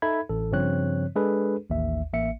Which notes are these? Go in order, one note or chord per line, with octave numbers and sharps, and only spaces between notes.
D#4 A4 E5 B5 G#6
A1 A4
G2 C#3 F3 C4 C#5 F#6
G#3 D4 G#4 A4 B4
A1 D#2 E5
A1 A#3 E5 C#7